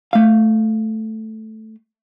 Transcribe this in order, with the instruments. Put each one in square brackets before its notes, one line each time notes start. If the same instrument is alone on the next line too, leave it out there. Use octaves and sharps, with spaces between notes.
[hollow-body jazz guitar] A3 F5